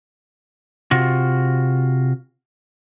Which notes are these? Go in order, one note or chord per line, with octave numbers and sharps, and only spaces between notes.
C3 F4 F#4